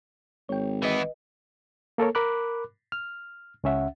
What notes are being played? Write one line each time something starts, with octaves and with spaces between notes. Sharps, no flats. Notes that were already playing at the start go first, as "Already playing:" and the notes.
G#1 C#5 G5
E3 B3 B4 D#5
A#3 A4 A#4 C#5
A#4 B5 D6 F#6
F6
C#2 C#4 E5 F#5